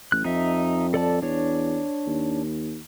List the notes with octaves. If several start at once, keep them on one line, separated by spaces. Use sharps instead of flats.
A1 F#6
F2 D#4 E5
A4 D5 A5
E2 D4 C#5
D#2